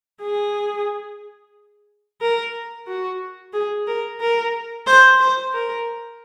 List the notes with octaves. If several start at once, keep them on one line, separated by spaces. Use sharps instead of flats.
G#4
A#4
F#4
G#4
A#4
A#4
C5
C5
A#4